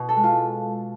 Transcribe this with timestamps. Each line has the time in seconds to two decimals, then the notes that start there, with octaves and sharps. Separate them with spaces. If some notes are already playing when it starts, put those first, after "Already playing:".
Already playing: B2
0.09 A4
0.17 G#3
0.24 F4